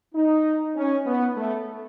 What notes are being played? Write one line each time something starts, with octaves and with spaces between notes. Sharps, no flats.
D#4
C#4
B3
A3